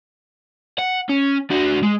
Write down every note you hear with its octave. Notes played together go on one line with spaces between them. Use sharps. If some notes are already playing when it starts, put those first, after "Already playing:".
F#5
C#4
D4 F#4
G#3